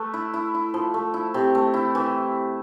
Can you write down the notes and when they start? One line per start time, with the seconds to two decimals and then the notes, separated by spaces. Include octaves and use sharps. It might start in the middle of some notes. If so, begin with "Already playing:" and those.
Already playing: A3 B4
0.14 E4
0.34 E4
0.54 E4
0.74 F3
0.94 A3
1.14 E4
1.34 C3
1.55 A3
1.74 E4
1.95 E3